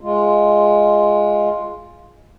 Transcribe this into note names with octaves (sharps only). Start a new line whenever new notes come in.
G#3 F4